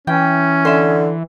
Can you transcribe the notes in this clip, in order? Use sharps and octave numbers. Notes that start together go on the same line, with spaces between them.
E3 C#4 G5
D3 E5 C6